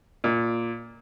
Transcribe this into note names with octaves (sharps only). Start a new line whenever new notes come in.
A#2